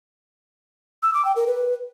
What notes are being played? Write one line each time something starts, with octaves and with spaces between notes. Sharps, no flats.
E6
D6
G5
A#4
B4